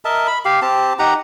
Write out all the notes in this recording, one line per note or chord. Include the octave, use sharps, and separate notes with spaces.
A#4 D#5 E5 A5
B5
G4 F5
C4 G4 A5
D#4 G4 F#5 A#5